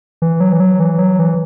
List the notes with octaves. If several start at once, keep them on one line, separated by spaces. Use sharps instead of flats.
E3
F#3
E3
F#3
E3
F#3
E3